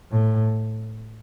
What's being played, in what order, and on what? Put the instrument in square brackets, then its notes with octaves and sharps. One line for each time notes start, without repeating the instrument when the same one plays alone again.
[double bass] A2